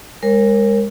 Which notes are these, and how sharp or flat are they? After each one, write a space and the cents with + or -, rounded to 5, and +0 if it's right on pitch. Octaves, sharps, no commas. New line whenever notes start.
G#3 -30 A#4 +0 C#5 -40